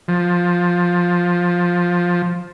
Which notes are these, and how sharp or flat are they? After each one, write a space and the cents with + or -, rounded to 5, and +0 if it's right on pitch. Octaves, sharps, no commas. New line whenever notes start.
F3 +10